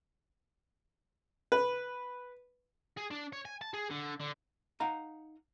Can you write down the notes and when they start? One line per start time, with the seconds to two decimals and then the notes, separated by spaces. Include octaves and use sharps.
1.52 B4
2.98 G#4
3.11 D4
3.33 C#5
3.45 G#5
3.61 A5
3.73 G#4
3.90 D3
4.20 D3
4.80 D#4 F5 F#5 A#5